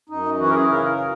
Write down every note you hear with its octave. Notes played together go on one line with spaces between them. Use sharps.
F#2 D#4
E3 F#4
A#4
G#4
C#3 A#4
A#4
F#3